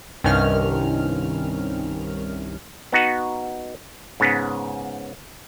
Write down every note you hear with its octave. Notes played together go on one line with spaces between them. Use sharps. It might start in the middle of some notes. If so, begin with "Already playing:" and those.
C2 G2 D#3 C#4 F6
B3 D#4 F#4 F#5
G#2 C#3 B3